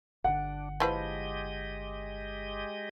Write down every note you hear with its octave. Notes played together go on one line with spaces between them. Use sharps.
G1 D3 D4 F#5
F3 G#3 E4 G4 B4 D#5